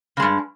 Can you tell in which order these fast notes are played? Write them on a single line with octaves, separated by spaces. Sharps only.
C#3 G#3 G2